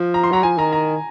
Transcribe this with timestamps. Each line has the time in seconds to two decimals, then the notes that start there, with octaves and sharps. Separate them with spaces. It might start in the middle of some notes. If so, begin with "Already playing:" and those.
Already playing: F3
0.14 A#5
0.23 C6
0.31 F#3 A#5
0.43 F3 G#5
0.58 D#3 A#5
0.73 A#5